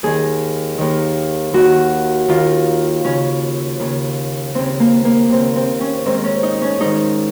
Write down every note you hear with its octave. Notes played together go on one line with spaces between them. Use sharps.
D#2 D#3 G#4
D#2 D#3
D#2 D#3 F#4
D#2 D#3 F4
D#2 C#3 C#4
D#2 C#3
D#2 C#3 C4
A#3
A#3
D#2 C#3 C4
C4
C#4
G#2 D#3 C4
C#4
D#4
C#4
G#2 D#3 D#4